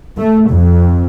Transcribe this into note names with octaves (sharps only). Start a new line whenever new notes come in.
A3
F2